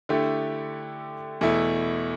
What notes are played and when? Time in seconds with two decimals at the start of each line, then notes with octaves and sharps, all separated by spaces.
0.09 D3 A3 E4 G4
1.41 E2 B2 A3 E4